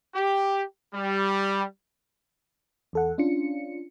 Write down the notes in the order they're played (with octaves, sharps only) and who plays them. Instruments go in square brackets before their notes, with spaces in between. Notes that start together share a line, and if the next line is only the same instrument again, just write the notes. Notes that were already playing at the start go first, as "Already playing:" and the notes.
[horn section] G4
G3
[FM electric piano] E2 A4 F#5
C#4 D4 F4 C#7